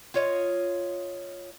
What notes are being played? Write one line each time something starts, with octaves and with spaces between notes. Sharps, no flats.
F4 C#5 D#5